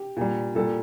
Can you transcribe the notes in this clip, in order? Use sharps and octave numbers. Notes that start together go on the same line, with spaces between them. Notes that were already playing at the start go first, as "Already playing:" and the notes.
Already playing: G4
A#2 G3
A#2 G3 A4